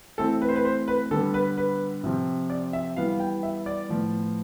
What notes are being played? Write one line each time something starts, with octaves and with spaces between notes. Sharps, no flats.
E3 A3 C4 A4
B4
C5
B4
C5
B4
D3 G3 B3 A4
B4
B4
C3 F3 C4
D5
E5
E3 G3 B3 F5
G5
E5
D5
A2 F3 B3